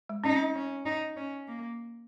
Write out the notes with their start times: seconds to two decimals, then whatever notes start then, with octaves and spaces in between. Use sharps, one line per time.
0.09 G#3
0.24 C#4 D#4
0.32 C4
0.55 C#4
0.86 D#4
1.17 C#4
1.48 A#3